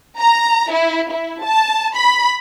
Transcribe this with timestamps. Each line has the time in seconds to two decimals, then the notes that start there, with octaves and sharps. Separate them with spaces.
0.18 A#5
0.71 E4
1.12 E4
1.43 A5
1.96 B5